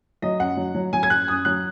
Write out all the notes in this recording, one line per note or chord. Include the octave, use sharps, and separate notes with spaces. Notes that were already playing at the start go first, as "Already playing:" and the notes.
F#3 D#5
F#2 F#5
F#3
F#3
F#3 G#5
G#6
F#2 F#6
F#2 D#6
F#3 F#6